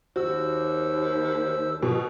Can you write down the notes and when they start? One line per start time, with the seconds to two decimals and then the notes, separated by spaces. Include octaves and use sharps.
0.16 D#2 F#4 C5 E6
1.83 B2